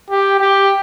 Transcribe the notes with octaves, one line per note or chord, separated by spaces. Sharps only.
G4
G4